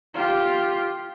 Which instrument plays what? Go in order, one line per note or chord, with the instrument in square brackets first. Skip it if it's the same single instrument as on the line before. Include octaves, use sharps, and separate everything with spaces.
[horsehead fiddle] F4 G4